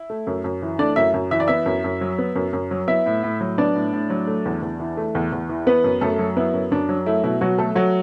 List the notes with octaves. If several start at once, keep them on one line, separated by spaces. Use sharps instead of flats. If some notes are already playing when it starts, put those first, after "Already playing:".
Already playing: E4
A3
F#2
F#2
E3
A3 D4 D5
F#2 E4 E5
F#2
E3 E5
D5
B3 E4 E5
F#2
F#2
F#3
B3
F#2
F#2
F#3
B3 E4 E5
A2
A2
F#3
B3 D4 D5
A2
A2
F#3
A3
E2
E2
E3
A3
E2
E2
E3
B3 B4
F#2
F#2 A3 A4
F#3
B3 E4
F#2
F#2 D4
F#3
A3 E4
B2 E4
B2 F#3 F#4
F#3 A3 A4
F#3 A3 F#4